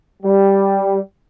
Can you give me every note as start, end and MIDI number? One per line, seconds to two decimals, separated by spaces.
0.23 0.96 55